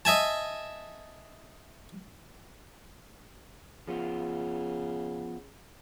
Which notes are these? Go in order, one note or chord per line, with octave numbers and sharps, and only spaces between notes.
D#5 E5 G#5 A5
C#3 F3 B3 F4